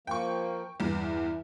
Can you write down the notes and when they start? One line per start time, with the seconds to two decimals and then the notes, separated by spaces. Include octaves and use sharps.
0.07 F3 A#3 G5 C#6
0.80 E2 G2 E3